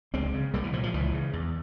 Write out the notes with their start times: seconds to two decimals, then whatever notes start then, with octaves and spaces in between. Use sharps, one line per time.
0.13 C#2 G#3 C4
0.34 C#3
0.54 C2 G3 A#3
0.64 E3
0.73 A#2 F3
0.83 F3
0.94 C#2 E3
1.13 C#3
1.33 E2